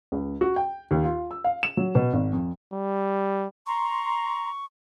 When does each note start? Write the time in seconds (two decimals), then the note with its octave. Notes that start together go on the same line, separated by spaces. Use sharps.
0.12 C#2
0.41 F#4
0.56 G5
0.91 D#2
1.04 F4
1.31 E6
1.44 F5
1.63 E7
1.77 F#3
1.95 B2
2.13 G#1
2.33 F2
2.72 G3
3.66 A#5 C6 C#6